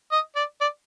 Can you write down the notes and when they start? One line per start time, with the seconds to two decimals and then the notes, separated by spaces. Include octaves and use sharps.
0.11 D#5
0.36 D5
0.61 D5